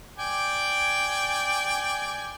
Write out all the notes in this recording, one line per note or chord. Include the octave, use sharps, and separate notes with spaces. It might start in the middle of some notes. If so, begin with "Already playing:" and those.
D5 G5 G#5